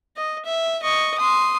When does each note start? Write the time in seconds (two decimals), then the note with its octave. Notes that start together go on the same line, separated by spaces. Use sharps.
0.17 D#5
0.45 E5
0.83 D#5 C#6
1.18 C6 D#6